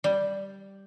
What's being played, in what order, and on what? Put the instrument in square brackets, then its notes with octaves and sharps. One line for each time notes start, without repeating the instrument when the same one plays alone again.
[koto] G3